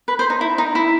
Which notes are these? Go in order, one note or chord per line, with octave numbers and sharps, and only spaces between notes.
B4
C5
D#4
E4
D#4
E4